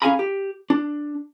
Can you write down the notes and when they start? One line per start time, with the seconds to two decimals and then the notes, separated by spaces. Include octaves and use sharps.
0.02 C#4 G#4 F5 G#5 A#5 B5
0.19 G4
0.70 D4